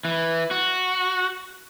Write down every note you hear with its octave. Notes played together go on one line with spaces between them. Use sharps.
E3
F#4